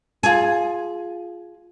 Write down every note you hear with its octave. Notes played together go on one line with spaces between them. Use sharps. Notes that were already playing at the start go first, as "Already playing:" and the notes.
F4 G#4